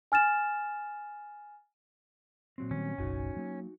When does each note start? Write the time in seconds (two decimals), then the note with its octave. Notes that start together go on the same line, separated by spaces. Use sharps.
0.12 G#5 F6 A6 E7
2.58 A#2 F#3 C4
2.71 D#3 G3 C#4
2.98 F#1 B1 D#4 F#4 G#5
3.37 F#3 A#3